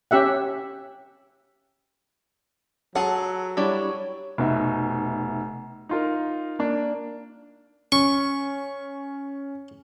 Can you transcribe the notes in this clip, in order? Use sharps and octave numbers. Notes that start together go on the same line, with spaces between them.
C#4 G4 E5 F#5
F#3 F4 G#4 A4 F#5
G3 D4 E4 C#5
F1 B2 D#4 E5
D#4 F4 A#4
A#3 D4
C#4 C#6